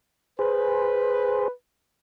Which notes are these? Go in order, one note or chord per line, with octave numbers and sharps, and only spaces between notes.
G#4 B4 C5